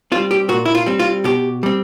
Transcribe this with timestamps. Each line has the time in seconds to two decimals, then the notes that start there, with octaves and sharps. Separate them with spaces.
0.12 C4 F4
0.16 G3
0.31 G4
0.49 A#2 F#4
0.65 E4
0.75 F4
0.86 G3 C4
0.99 F4
1.24 B2 G4
1.63 G3 C4